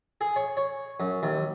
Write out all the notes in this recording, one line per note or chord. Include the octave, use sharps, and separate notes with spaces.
G#4
C#5
C#5
F#2
D#2